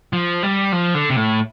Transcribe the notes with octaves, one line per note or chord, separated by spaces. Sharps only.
F3
G3
F3
D3
C3
A2